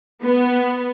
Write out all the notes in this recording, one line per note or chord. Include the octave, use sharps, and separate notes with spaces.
B3